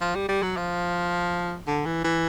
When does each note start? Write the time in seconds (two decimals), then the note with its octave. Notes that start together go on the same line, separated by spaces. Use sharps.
0.01 F3
0.15 G3
0.29 G3
0.42 F#3
0.57 F3
1.67 D3
1.86 E3
2.04 E3